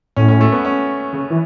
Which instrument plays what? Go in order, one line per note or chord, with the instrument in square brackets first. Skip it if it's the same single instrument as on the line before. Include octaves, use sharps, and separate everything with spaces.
[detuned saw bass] A2 [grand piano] C#4
[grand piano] C#4
A3
B3
C#4
[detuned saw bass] C#3
E3